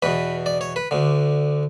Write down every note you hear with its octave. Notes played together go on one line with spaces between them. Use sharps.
E2 B2 B4
D5
C#5
B4
D2 D3